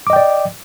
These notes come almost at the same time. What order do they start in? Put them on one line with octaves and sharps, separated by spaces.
D6 D#5 G5 D5